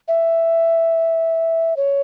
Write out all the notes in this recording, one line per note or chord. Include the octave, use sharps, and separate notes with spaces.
E5
C#5